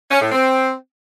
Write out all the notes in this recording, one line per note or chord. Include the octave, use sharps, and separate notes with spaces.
C#4
A2
C4